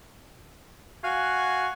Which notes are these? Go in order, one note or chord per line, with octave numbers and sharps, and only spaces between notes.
F#4 F5 G#5